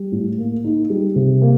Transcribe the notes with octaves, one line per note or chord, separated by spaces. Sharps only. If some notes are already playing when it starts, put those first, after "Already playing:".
Already playing: G3
A2
A#3
D#4
G3
C3
A#3